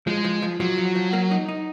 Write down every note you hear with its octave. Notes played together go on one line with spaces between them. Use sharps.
F3 G#3
F3
F3
F3 F#3
F3
F3
A#3
D#4
D#4